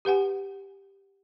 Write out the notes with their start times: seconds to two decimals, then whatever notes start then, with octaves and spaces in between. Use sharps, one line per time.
0.05 G4 B4 F#5 G#5